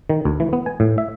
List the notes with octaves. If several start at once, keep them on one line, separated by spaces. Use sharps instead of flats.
D#3
D2
E3
B3
G#5
A2
E5